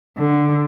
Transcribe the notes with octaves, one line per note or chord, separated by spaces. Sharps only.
D3